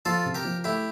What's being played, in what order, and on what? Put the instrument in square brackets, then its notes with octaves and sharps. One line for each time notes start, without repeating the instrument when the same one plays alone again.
[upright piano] F3 [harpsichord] F4 A4
[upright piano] C3
[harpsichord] G4 A#4
[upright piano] F3
[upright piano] A3 [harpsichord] E4 G4